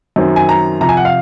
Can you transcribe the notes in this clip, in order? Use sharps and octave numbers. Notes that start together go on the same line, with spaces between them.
F#2 D#3 F#3 C4
G#5
A#5
F2 C3 F3 A#5
G#5
F#5
F5